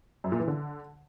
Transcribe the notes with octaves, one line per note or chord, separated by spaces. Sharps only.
F#2
A#2
E3
D3